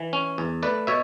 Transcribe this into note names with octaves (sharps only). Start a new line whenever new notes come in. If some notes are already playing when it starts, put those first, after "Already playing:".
Already playing: E3
C#4
E2
A3 B4 D5
B2 C#5 E5